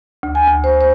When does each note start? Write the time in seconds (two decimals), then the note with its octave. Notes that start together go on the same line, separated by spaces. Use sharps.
0.23 D2
0.35 G#5
0.48 D2
0.64 C5
0.81 C5